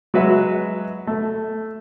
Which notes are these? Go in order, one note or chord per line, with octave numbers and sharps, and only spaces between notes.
F#3 G#3 F#4 B4 E5
A3